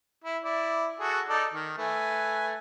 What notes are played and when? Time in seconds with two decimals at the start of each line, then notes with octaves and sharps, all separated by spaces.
0.24 E4
0.44 E4 D5
1.00 F#4 G#4 A4
1.29 D#4 A4 D5
1.54 D#3
1.78 A3 B4 G#5